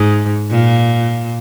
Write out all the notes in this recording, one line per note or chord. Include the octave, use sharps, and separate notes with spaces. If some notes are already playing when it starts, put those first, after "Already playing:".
Already playing: G#2
A#2